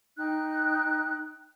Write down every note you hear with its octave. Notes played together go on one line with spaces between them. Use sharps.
D#4 G5 F#6